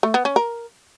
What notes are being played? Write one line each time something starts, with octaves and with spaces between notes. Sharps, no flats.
A3
B3
C#4
A#4